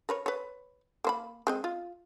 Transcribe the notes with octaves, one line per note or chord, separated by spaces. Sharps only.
A#4 B4 C#5
B4 C#5
A#3 C5 B5
G#3 C4 D#5
F4